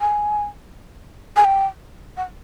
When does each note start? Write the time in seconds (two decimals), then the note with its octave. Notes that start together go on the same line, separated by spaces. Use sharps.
0.01 G#5
1.37 G#5
1.44 G5
2.17 F#5